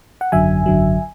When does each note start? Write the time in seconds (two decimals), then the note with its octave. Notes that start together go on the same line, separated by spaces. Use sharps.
0.21 F#5
0.32 G#1 F#2 D3 F#3 E5 G#5
0.66 G#1 F#2 D3 F#3